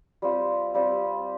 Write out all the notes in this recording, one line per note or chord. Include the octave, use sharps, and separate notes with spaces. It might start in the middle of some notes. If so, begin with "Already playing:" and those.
G3 C4 F4
G3 C4 F4